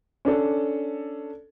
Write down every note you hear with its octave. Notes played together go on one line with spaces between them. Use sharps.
C#4 D4 A4